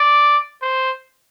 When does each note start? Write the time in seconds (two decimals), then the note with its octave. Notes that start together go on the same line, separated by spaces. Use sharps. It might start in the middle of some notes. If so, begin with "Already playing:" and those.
Already playing: D5
0.62 C5